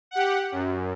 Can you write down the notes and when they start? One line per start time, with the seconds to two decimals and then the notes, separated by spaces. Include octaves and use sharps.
0.11 G4 F#5
0.52 F#2